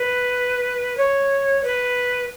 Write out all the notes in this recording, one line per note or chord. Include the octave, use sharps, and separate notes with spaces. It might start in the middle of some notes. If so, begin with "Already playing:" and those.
Already playing: B4
C#5
B4